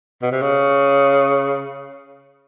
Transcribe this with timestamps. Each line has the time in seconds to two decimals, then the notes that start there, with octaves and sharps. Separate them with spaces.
0.22 B2
0.31 C3
0.42 C#3